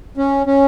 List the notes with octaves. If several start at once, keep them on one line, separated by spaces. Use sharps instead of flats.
C#4
C#4